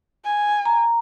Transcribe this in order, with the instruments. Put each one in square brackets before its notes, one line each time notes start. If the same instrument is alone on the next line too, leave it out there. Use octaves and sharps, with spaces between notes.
[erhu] G#5
[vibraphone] A#5